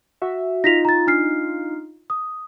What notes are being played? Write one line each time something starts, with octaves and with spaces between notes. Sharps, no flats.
F#4 E5
D#4 F4 A#6 B6 F7
A#5 A6
D4 F6 C7
D#6